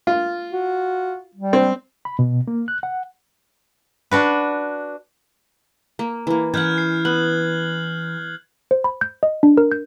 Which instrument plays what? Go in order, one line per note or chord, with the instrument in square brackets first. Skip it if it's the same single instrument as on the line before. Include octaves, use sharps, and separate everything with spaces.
[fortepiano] F4
[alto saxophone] F#4
G3
[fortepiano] C4
[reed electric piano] B5
B2
A#3
F#6
F#5
[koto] D4 F#4 B4
[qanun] A#3
E3 A#3
[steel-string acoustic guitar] E3 [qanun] C#4 F#5 [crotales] F6 G6 G#6
[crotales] C7
[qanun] B3 [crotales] F#6 F#7
[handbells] C5
B5
G6
D#5
D4
A#4
G6